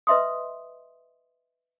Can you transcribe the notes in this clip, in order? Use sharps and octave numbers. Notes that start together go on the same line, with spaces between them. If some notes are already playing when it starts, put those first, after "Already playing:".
B4 D#5 E5 C6 D#6